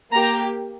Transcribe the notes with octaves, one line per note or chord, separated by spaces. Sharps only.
A#3 G4 A#5